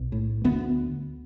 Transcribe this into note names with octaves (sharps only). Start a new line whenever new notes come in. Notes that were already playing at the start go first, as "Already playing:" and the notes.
Already playing: B1
A2
D2 B3